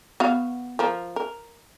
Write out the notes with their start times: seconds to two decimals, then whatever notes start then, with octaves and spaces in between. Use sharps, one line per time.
0.20 B3 F#4 F5
0.79 F3 A#4
1.16 A#4